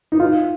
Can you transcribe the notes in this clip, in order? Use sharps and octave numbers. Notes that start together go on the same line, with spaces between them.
D#4
F4